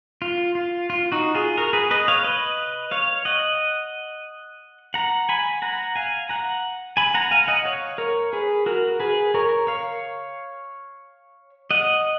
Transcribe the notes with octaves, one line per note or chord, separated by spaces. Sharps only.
F4
F4
F4
D#4 F#4
F4 G#4
F#4 A#4
G#4 B4
B4 D#5
C#5 F5
B4 D#5
C#5 F5
D#5 F#5
F#5 A#5
G#5 B5
F#5 A#5
F5 G#5
F#5 A#5
G#5 B5
F#5 A#5
F5 G#5
D#5 F#5
C#5 F5
A#4 C#5
G#4 B4
F#4 A#4
G#4 B4
A#4 C#5
C#5 F5
D#5 F#5